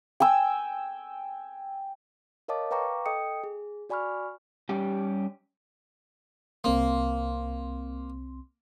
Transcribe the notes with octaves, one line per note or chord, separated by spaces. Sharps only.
G5 G#5 E6
A#4 C#5 D#5 F5 A5 D6
B4 F5 G5 A#5 C#6 D6
A4 D#5 G5 D#6 C#7
G#4
F#4 D5 G#5 B5 C#6 F6
G3 C#4 G4
C2 A#3 C4 C6